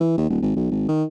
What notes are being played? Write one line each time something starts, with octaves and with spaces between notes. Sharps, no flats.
E3
D#2
D#1
G#1
B1
G#1
D#3